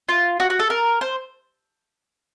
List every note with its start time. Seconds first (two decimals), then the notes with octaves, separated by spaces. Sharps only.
0.09 F4
0.40 F#4
0.50 F#4
0.59 A4
0.70 A#4
1.01 C5